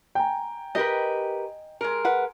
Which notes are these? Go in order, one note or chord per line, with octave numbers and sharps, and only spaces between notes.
G5 G#5 A#5
G4 A#4 B4 D#5
G#3 A#4
B4 F#5